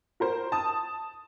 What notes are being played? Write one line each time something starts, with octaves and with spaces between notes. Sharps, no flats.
F#4 A#4 C5
A5 D#6